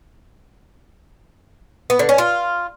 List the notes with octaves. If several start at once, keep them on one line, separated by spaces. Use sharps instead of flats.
B3
D3
C#4
F4